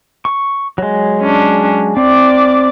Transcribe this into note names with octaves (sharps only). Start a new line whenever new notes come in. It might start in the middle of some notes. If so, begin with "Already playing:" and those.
C#6
F#3 G#3
C#4 D4
C4 D5 D6